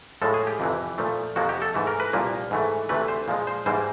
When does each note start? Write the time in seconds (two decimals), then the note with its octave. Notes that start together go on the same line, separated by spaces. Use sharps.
0.22 A2 F3 G#3 A4
0.34 G#4
0.47 G4
0.60 F2 C3 E3
0.98 A#2 F3 A3
1.36 F2 C3 F3 A#3 F#4
1.49 G4
1.62 A4
1.74 G#2 E3 A3
1.87 A#4
2.00 B4
2.13 C2 A#2 F3 A#3
2.51 G#2 E3 A3
2.89 D2 C3 E3 A3 B4
3.08 C5
3.28 A#2 F3 G#3
3.47 C5
3.66 G#2 E3 G3 A#3 C5